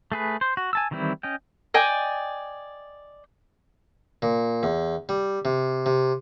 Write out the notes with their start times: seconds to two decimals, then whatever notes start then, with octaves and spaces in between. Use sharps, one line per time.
0.12 A3 G#4 B4
0.41 C5
0.57 F#4
0.73 G#5 A5 E6
0.91 D#3 E3 G3 C4 E4
1.23 C#4 D#5 G5
1.74 D5 D#5 G5 G#5
4.22 A#2
4.63 E2
5.09 G3
5.45 C3
5.86 C3